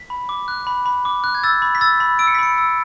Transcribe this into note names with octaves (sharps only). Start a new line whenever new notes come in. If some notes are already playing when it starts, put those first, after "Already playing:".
Already playing: B6
B5
D6
F#6
B5
B5
D6
F#6
G#6
E6 A6
B5
B6
E6 A6
B5
E6 D7
C#7
B6
B5 C#7
E6